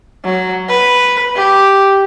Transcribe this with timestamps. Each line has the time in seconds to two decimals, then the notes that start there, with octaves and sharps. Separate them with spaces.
0.25 F#3
0.69 B4
1.35 G4